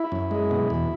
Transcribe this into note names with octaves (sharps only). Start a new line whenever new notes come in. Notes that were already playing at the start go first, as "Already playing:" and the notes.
Already playing: E4
F#2
G#3
B2
E2